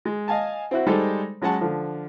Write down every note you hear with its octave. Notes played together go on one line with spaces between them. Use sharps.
G#3
D#5 F5 G#5 A5
C4 E4 F#4
G3 G#3 D#4 A4 C5
F#3 G#3 C#4 F#5 A5
D3 F3